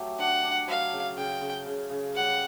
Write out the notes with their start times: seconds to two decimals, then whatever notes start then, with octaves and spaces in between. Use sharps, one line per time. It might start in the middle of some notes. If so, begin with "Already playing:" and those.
Already playing: F#3 A3 G4
0.19 D4 F#5
0.43 D4
0.68 F#3 F5
0.92 C#3
1.17 C#3 G5
1.41 C#3
1.66 C#3
1.90 C#3
2.15 G3 F#5